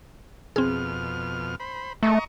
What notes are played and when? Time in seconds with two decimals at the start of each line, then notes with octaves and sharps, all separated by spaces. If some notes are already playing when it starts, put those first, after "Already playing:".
0.56 F2 B2 C4 G#4 F6
1.60 C5 B5
2.03 A3 D#5 A#5 C#6